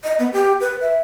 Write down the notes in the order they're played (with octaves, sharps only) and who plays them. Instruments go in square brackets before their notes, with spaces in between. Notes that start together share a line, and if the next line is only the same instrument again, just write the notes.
[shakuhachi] D#5
B3
G4
B4
E5